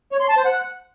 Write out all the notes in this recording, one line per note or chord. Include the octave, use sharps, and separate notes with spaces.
C#5
C6
A5
C5
F#5